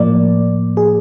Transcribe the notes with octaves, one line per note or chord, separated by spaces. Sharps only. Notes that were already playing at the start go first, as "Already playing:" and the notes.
Already playing: A2 F3 A#3 D5
G#4